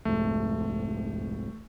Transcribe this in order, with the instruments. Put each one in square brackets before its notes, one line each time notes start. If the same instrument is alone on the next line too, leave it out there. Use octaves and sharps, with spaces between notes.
[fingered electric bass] C2 F2 G#2 [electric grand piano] A3